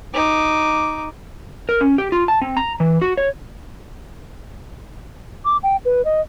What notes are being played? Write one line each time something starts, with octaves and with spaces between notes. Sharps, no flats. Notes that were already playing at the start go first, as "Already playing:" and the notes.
D#4 D6
A#4
C#4
G4
F4
A5
C4
A#5
E3
F#4
C#5
D6
G5
B4
D#5